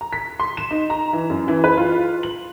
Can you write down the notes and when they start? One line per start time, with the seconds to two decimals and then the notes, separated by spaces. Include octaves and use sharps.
0.01 A#5
0.13 B6
0.40 C6
0.57 E7
0.71 D#4
0.90 A#5
1.13 E3
1.30 F#2
1.48 E3
1.64 B4
1.77 F4
2.23 F#7